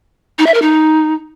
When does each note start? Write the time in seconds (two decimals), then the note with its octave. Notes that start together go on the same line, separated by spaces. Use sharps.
0.39 D#4
0.46 E5
0.54 A#4
0.62 D#4